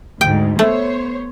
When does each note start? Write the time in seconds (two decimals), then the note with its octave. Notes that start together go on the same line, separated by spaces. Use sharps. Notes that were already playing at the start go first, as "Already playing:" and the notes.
0.21 D2 G#2 G5
0.59 A3 B3 C5 C#5